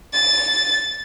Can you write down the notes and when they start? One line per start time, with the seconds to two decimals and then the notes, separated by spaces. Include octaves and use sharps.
0.14 A6